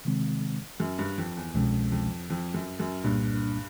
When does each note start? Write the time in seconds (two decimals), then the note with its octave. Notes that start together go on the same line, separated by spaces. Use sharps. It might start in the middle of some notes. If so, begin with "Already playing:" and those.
0.05 C3 D#3 G#3 C4
0.80 F#2
0.99 G2
1.18 F2
1.37 E2
1.54 C2 F2 B2 G#3 C#4
1.92 F2
2.30 F2
2.54 F#2
2.80 F#2
3.04 C2 G2 A#2 G3 A#3 D4